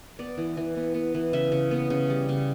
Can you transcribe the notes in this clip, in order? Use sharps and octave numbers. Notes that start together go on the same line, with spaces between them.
B3 D5
E3
E3
B3
B3
E3
C#3 E5
C#3
B3
C#3
G3
C#3